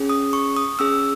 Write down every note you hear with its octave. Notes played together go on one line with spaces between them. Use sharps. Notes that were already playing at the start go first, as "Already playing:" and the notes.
Already playing: C#4 G#4
D#6
C#6
D#6
C#4 G#4 E6